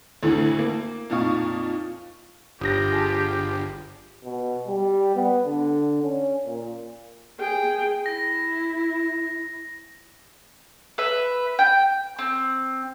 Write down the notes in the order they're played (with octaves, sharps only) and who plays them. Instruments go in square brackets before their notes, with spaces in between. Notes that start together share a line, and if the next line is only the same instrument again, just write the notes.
[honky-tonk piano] D2 A2 D3 E3
A#3
F2 A#2 D#4 F5 C#6
[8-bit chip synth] G1 [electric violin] F4 G4 [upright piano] D#6 A#6
[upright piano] G#4 A5
[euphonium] B2
G3
B3
D3
C#4
A#2
[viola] G#4 G5
[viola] E4 [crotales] A#6
[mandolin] B4 E5
G5
C4